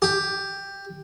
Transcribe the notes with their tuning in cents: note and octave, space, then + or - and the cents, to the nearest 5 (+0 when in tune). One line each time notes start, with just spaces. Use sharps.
G4 +10